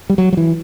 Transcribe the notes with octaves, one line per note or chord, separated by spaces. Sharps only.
G3
F#3
F#3
E3